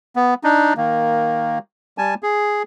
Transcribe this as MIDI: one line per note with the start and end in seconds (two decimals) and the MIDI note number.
0.16 0.34 59
0.44 0.73 62
0.44 0.73 63
0.77 1.59 51
0.77 1.59 58
1.98 2.14 55
1.98 2.14 80
1.98 2.14 81
2.23 2.63 68